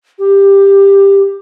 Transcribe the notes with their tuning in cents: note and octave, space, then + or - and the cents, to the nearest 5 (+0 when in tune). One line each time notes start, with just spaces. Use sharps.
G4 +10